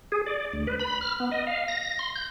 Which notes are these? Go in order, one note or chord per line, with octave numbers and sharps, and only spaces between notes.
G#4
D5
D2
B4
B5
F6
B3
D#5
F5
A#6
C6
G6